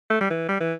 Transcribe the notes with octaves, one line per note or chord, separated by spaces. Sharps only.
A3
G3
E3
G3
E3